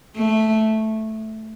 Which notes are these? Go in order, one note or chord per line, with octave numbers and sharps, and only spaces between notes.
A3